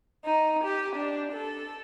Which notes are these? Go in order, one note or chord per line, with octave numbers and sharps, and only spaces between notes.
D#4
G4
D4
A4